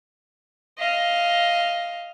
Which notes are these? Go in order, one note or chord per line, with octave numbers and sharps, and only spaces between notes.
D#5 F5